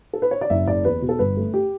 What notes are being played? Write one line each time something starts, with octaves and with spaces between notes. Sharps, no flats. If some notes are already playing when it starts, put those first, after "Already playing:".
A4
B4
C#5
D5
F#1 E5
F#1 D5
E2 B4
B2
A4
G1 B4
A3
G4